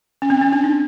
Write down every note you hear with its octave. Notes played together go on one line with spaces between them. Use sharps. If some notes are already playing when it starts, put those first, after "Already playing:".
C#4
C4
C#4
D4
D#4